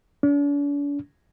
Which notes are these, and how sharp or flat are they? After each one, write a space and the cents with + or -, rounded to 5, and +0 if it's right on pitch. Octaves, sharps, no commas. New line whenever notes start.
D4 -45